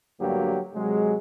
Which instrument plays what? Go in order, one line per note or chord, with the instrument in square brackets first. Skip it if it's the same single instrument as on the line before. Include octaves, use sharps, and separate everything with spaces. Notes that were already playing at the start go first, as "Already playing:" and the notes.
[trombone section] D2 G2 F#3 A#3 G4
C3 F#3 G#3